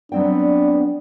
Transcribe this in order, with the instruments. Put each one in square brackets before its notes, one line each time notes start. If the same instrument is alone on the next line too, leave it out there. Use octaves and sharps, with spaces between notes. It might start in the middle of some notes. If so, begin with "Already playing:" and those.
[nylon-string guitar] F#3 C4 G5 [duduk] B3 [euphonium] D4 [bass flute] D5